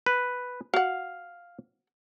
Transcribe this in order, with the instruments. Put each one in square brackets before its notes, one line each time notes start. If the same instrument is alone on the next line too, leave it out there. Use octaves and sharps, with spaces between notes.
[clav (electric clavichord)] B4
[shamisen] F#4 F#5 [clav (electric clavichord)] F5